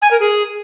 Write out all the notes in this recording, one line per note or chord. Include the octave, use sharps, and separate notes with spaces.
G#5
A#4
G#4